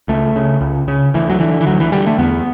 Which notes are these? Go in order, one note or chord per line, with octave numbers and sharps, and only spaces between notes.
C#2 A3
C#3
C#2
C#3
D2 E3
F#3
D3 E3
E3
D2 F#3
E3
D3 G3
A3
E2 B3